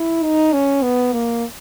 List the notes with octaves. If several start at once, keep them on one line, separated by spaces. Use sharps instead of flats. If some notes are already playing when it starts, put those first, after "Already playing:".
Already playing: E4
D#4
C#4
B3
A#3